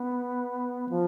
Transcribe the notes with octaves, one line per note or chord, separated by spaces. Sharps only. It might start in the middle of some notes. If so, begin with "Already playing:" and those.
Already playing: B3
F3